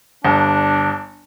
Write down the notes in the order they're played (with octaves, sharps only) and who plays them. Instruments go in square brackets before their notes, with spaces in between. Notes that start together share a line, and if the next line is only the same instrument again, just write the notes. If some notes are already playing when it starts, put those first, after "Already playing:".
[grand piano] G1 [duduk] D4